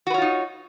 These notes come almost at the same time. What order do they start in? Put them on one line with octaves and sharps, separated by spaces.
F#4 B4 C#5 F4 D#4